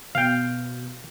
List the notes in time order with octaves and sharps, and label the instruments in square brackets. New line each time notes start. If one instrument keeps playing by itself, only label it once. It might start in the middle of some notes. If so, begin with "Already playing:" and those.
[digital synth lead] B2 [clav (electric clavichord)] F5 G5